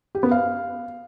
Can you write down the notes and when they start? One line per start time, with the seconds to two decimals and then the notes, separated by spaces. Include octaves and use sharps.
0.15 G4
0.23 B3
0.31 F5